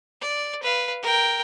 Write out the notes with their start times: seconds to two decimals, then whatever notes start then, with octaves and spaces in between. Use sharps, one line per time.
0.21 D5
0.62 B4 F5
1.03 A#4 G5